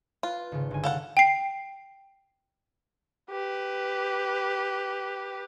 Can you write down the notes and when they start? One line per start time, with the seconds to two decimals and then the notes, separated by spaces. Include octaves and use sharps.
0.23 F4 B4
0.52 G#1 C#3
0.71 G1 G#5
0.84 A4 F5 F#5
1.17 G5 C7
3.31 G4 B4